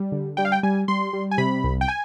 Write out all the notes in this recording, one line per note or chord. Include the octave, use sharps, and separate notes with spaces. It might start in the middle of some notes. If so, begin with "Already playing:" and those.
Already playing: G3
D3
G3 G5
F5
G5
G3 G#5
G3 C6
G3
G#5
C3 B5
C2
G5
G#5